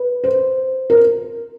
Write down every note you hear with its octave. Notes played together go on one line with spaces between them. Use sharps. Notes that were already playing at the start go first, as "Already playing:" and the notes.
Already playing: B4
C5
A#4